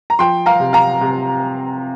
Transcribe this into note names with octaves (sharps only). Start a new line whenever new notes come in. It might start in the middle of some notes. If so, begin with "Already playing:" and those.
A#5
F3 G5 C6
F5 A#5
C3
F5 A#5
C3